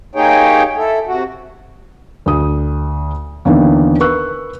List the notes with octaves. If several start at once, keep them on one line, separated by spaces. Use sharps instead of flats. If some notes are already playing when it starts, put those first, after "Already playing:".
A#3 D#4 G4 G#4 C#5 G5
E4 A4
C3 F#4
D2 D#6
D#2 D3 E3 A#3 B3 D4
A#4 B4 C#6 E6 F#6